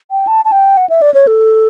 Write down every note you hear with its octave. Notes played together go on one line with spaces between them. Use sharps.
G5
A5
A5
G5
F#5
E5
D5
C#5
A4